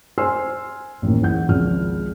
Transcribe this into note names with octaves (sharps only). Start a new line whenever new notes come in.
C5 G#5 C6 E6 F6 C7
A1 D#2
G#2 E3 F#5 G6
G#1 C#2 F3 F6